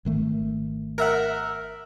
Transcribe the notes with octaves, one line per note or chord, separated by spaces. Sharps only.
G#1 D#3 A3
A#4 E5 F#5